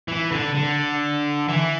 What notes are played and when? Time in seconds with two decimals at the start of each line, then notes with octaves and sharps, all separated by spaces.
0.08 E3
0.32 D3
0.55 D3
1.48 E3